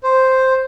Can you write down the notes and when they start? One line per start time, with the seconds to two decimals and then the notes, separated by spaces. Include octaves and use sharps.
0.04 C5